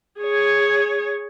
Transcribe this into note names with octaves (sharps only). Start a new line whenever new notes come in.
G#4 C#5